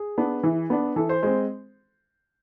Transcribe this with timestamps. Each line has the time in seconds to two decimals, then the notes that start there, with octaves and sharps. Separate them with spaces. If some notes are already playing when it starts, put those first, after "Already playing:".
Already playing: G#4
0.18 B3 D4
0.43 E3
0.70 B3 D4
0.96 E3 A4
1.09 C5
1.23 G#3 C4 C5